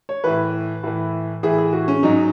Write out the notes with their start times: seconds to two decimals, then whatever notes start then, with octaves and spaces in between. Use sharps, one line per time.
0.09 C#5
0.24 A2 E3 B4
0.83 A2 E3
1.43 A2 E3 G#4
1.58 G#4
1.73 F#4
1.88 C#4
2.03 G#2 F#3 D#4